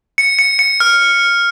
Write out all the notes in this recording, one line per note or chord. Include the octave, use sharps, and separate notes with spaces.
C#7
C#7
C#7
F6